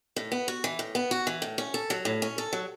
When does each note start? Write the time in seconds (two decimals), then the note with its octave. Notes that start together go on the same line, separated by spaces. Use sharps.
0.16 A2
0.32 B3
0.48 F#4
0.64 E3
0.79 A2
0.95 B3
1.11 F#4
1.27 E3
1.42 A2
1.58 C#4
1.74 A4
1.90 F#3
2.05 A2
2.22 C#4
2.38 A4
2.53 F#3